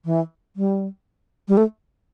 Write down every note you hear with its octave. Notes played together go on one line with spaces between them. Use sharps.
E3
G3
G3
A3